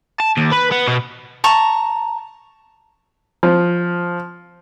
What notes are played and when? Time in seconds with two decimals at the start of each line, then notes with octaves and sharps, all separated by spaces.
0.20 A5
0.37 D#2
0.52 B4
0.71 B3
0.87 B2
1.44 A5 A#5 C#6
3.43 F3